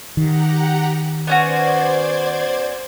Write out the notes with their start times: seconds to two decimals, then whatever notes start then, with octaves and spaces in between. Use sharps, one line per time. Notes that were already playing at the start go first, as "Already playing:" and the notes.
0.17 D#3 G4 F#5 A#5
1.27 B3 C#4 F#4 C5 D5 G#6